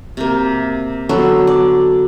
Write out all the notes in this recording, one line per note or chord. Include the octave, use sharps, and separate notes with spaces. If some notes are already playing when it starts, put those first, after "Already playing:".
C3 A#3
D3 F#3 B3 A4
D5